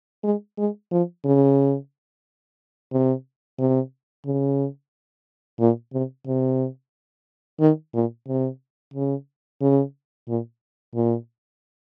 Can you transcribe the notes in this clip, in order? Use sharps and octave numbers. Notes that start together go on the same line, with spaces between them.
G#3
G#3
F3
C#3
C3
C3
C#3
A#2
C3
C3
D#3
A#2
C3
C#3
C#3
A#2
A#2